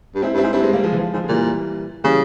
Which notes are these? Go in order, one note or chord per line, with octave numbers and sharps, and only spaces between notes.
G2
G#2 C4 E4
G2
C4 E4
G#2
G2 C4 E4
G#3 C4
G3 A#3
F3 G#3
E3
F3
G#2 F3
G#3
A#2 E3 G3
C#3 E3 G3